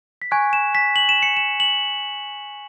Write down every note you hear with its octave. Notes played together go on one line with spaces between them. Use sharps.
B6
G#5 C#6 F#6 G#6
E7
B6
F#7
E7
C#7
E7
F#7